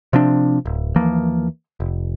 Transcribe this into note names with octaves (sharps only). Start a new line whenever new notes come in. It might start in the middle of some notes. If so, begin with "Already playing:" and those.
C3 F3 C4 D4
D1
D#2 E3 F3 A#3
F1